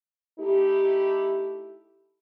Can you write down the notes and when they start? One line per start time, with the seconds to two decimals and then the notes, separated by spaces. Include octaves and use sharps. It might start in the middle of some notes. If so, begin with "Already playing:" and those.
0.39 A3 D#4 E4 G4